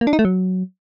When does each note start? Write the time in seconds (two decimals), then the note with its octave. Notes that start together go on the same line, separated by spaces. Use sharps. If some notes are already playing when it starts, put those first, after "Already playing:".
0.01 A#3
0.07 D4
0.13 D#4
0.19 A3
0.25 F#3